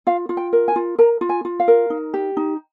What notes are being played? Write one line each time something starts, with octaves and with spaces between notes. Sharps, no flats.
F4 F5
F4
G5
A#4
G#5
F4
A#4 A#5
F4
G#5
F4
F5
A#4
D#4
G4
D#4